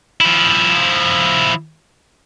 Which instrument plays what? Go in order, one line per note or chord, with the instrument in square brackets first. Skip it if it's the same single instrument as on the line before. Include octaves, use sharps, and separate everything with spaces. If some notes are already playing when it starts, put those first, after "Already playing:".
[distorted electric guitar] F3 E4